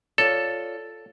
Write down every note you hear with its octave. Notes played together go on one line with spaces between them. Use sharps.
F4 A4 C#5 D5